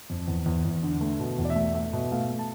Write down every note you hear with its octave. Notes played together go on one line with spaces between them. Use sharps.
F2
E2
E2
E2
D3
A3
B2
E2
D5
E5
A3
A3 E5
B2
A3 F5
A3
A5